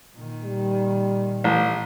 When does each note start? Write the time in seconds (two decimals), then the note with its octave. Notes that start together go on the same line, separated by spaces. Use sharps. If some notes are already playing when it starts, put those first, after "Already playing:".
0.15 A#2 D#3
0.45 G3
1.44 A1